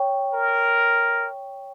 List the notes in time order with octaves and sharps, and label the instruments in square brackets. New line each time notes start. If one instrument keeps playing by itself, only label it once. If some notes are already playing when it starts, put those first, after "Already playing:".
Already playing: [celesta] C#5 G5 C#6
[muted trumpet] A#4